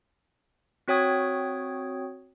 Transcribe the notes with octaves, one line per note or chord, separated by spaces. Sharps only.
C4 F#4 C#5 G5 D#6 G#6